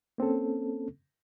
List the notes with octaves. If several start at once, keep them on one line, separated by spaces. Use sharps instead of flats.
A#3 C4 C#4 A4